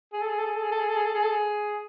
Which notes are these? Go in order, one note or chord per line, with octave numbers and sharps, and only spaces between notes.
G#4
A4
G#4
A4
G#4
A4
G#4
A4
G#4
A4
G#4
A4
G#4
A4
G#4